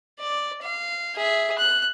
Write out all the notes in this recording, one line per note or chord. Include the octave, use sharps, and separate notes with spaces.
D5
F5
G#4 E5
F#6